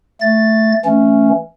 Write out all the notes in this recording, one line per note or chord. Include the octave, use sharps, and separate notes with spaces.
A3 A6
E3 A3 C#4